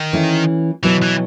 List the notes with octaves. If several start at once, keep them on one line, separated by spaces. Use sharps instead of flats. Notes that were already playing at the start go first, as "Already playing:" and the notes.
Already playing: D#3
E3 A3 C#4
B2 E3 F#3 B3 E4
E3